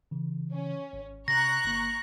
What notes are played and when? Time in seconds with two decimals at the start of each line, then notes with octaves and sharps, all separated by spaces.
0.11 C#3 E3
0.52 C#4
0.93 G#1
1.28 C3 A#5 C#6 F#6 A#6
1.64 G1 A#3